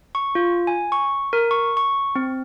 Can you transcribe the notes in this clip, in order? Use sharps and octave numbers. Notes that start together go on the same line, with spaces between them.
C#6
F4
G#5
C#6
A#4
C#6
C#6
C4